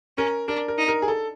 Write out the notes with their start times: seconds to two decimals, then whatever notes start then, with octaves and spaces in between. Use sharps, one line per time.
0.18 C#4 A#4
0.48 D4 A#4
0.68 A#4
0.78 D#4
0.88 A#4
1.02 G#4
1.08 A4